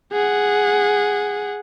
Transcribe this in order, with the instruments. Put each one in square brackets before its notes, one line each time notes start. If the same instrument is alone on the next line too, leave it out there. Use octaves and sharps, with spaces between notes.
[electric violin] G#4 F#5